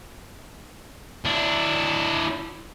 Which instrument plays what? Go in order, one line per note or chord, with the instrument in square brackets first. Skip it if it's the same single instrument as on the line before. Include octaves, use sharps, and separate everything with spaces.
[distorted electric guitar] D4 E4